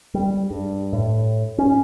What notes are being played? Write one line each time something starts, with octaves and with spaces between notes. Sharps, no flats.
G3
G2
A2
C#4